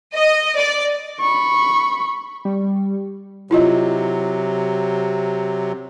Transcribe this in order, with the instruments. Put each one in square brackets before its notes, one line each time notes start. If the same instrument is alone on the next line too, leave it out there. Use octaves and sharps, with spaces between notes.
[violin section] D#5
D5
[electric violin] B5 C#6
[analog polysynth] G3
[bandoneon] C3 F#3 [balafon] E4 F4 D#5